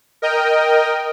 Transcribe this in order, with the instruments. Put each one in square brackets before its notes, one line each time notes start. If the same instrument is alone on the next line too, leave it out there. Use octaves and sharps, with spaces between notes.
[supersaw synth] A#4 D#5 G5